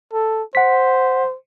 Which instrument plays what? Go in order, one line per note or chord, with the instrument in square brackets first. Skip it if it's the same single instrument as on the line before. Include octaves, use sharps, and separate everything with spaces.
[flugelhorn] A4
[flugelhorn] C5 [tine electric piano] F#5 B6